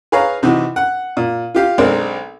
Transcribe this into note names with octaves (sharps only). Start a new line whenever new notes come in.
G#4 B4 C#5 F5 A#5
C3 E3 D#4 F#4
F#5
A#2
F4 G4 F5
B1 G#3 C4 D4 A#4